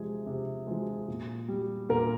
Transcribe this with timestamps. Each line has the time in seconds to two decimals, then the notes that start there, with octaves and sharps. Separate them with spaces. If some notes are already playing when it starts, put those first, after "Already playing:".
Already playing: C3 F3 G#3 G#4
0.26 C3
0.67 F3 G#3
1.08 A#2
1.48 G3
1.89 A#2 A#4